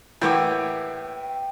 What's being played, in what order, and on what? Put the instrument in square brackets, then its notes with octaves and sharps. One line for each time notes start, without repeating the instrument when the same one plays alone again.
[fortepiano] A2 E3 [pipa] A#3 F#4 G4 [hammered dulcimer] G5